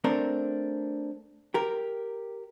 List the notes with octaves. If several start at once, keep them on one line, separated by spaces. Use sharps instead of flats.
A3 C4 D4 A#4
G4 A#4